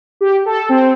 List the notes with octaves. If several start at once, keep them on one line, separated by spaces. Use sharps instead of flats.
G4
A4
C4